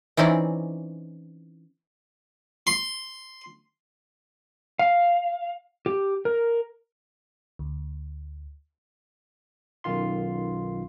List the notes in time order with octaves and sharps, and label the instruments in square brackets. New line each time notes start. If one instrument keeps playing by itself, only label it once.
[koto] E3 C4 C#4 D#4 D5
[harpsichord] C6
[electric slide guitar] F5
G4
A#4
[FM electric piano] D2
[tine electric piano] B1 F#2 D#3 F4 C6